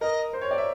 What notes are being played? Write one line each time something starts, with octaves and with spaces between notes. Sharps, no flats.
A#4 D#5
C5
C#5
D5
E5